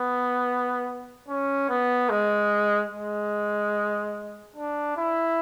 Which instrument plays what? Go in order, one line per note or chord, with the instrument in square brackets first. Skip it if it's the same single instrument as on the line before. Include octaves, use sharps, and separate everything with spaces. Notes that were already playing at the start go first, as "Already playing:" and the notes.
Already playing: [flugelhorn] B3
C#4
B3
G#3
G#3
D4
E4